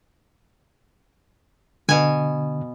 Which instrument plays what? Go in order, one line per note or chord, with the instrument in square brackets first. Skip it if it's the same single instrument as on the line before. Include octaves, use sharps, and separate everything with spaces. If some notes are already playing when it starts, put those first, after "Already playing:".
[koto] B2 G#5 [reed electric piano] D3